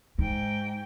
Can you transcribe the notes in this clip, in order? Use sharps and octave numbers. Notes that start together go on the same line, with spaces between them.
G#2 D#4 G5